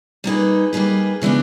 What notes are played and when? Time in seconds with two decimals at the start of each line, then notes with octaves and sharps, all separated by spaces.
0.24 G3 A#3 D#4 G#4 B4
0.73 G3 A#3 D#4 G#4 B4
1.22 C#3 E3 G#3 B3 D4